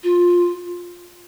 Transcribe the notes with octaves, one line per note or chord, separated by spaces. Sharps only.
F4